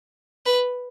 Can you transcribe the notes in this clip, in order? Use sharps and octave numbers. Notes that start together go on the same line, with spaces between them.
B4